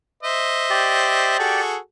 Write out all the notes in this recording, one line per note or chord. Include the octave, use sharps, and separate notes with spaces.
C5 D#5 E5
G4 D5
F#4 G#4 A4